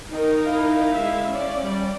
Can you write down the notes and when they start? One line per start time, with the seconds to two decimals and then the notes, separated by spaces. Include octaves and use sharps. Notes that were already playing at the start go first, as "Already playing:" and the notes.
0.11 D#3 D#4 A#4
0.46 E4 F5
0.94 G#3 E5
1.28 C#4 D5
1.63 G3